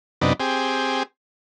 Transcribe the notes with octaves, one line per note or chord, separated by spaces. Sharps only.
F#2 C3 B3 D4 D#4
C4 G4 G#4